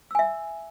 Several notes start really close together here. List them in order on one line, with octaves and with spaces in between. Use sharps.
E6 G#5 E5